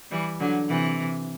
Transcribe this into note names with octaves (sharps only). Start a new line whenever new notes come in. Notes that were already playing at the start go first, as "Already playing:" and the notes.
E3 G3
D3 F#3
C3 E3